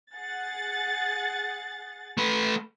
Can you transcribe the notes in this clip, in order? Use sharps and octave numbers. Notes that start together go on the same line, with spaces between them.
G#4 F#5 A6
A3 B4